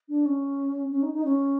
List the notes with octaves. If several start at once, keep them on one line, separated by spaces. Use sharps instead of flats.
D4
C#4
C#4
D#4
D#4
C#4